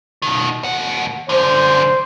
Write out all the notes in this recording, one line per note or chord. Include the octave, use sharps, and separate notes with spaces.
B2 D#3
D#2 F#5
F#2 D3 C5